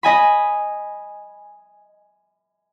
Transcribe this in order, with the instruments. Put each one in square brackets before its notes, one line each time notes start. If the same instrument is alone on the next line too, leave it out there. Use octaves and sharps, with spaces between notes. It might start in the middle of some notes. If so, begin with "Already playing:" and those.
[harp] D#5 G#5 B5